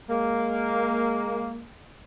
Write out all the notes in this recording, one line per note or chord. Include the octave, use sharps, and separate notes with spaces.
G#3 A#3